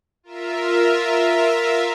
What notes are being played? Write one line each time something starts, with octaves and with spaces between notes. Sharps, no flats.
F4 A#4 E5